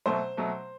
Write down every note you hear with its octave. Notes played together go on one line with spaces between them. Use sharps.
B2 F#3 A3 C5
B2 F#3 A3